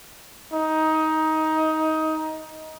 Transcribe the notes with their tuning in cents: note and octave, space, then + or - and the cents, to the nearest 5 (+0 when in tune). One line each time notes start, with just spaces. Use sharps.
D#4 +15